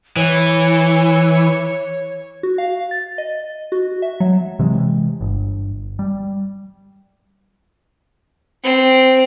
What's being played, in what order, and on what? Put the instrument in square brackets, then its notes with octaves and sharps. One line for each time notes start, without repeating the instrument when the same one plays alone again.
[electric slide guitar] E3 [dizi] C#5
[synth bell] F#4
F5
A6
D#5
F#4
E5
F#3
[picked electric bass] C3 E3 G#3
G1
G3
[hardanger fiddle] C4